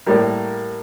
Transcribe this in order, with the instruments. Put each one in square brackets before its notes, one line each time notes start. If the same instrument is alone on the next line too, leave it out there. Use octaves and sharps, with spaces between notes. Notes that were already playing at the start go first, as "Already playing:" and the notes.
[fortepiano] A2 G3 A#3